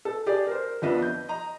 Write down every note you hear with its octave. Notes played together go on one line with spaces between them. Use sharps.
A4
G4 G#4 D5
A#4 C5
F2 F3 B3 D4 D#5 E5
G6
D#5 A#5